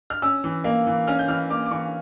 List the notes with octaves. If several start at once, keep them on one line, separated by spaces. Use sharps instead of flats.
F6
C#4 E6
E3
A#3
E3
C#4 F6
G6
E3 F6
A#3 D6
D6
E3 C#6